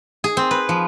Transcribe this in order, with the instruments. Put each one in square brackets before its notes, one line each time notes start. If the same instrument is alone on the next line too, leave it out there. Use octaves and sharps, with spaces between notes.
[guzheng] G#4
C4
B4
F3